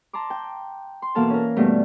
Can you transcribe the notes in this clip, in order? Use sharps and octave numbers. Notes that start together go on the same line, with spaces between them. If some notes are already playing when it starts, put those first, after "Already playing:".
A5 A#5 C6 D6
G5
C6
B2 E3 A#3 A4 F5 A5
C#4 A#4
G2 B2 A3 B3